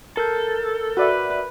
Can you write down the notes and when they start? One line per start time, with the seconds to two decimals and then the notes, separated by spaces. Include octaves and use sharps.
0.17 A4 A#4 G6
0.97 F#4 B4 D5 E5